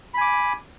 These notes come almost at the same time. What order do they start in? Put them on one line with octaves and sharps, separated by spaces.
B5 G#5 D6